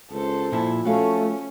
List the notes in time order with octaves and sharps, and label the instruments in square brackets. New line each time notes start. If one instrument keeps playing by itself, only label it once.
[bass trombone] C#2 [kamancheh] A4 C5
[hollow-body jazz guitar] A#2 E4 A5 [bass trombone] F3
[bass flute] A3 [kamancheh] C#4 [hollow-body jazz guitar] F#4 F5